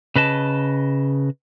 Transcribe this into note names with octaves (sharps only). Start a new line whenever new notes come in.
C#3 B4 D#5 A5